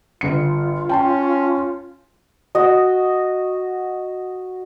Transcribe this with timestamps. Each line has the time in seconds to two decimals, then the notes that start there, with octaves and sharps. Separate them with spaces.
0.21 G1 F4 C#7
0.89 C#4 G5 A5 C6
2.55 F#4 D#5